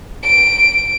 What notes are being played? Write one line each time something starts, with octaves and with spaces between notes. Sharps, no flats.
D7